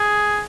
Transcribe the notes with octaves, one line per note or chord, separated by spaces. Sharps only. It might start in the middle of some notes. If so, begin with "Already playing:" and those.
Already playing: G#4